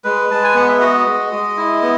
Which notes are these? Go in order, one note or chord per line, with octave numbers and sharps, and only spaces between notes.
G#3 B4
G#3 A5
G#5
B3 F#5
E5
F#4 D#5
G#3
G#3
E4
B3